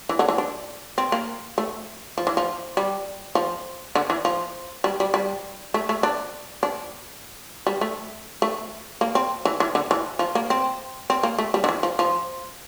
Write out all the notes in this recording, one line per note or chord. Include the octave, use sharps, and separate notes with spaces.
E3
D3
E3
D4
C4
A#3
A3
F3
E3
F3
G3
F3
D3
E3
F3
G3
G3
G3
A3
A3
D4
D4
G3
A3
A3
A#3
C4
E3
E3
D3
E3
F3
A#3
C4
C4
A#3
A3
G3
D3
E3
F3
F3